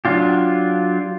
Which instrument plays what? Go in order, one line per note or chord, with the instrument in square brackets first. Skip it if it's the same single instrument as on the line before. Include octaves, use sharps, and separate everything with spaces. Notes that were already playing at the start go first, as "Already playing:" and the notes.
[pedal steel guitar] F#3 D4 F4 G4